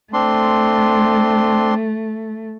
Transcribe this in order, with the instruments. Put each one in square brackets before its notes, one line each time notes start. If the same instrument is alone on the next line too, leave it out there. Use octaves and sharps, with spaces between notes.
[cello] A3 [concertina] C4 D4 C6